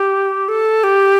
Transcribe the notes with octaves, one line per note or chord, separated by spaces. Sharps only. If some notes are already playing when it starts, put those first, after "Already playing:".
Already playing: G4
A4
G4